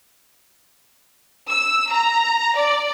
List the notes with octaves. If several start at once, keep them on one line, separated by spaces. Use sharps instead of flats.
E6
A#5
D5